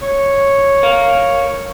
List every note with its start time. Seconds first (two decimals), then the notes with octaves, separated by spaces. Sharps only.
0.01 C#5
0.83 A#4 F5